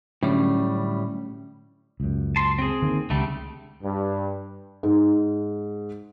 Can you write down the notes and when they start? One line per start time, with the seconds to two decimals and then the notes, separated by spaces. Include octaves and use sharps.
0.23 A2 D3 F#3 G3 C#4
2.00 C#2 F#2
2.36 A5 C6
2.59 C4 G#4
2.82 D3 D#3 A#3
3.10 C#2 D3 G3 A3
3.83 G2
4.83 G#2